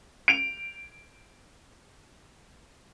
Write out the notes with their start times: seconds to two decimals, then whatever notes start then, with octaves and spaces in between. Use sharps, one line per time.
0.28 D7 F7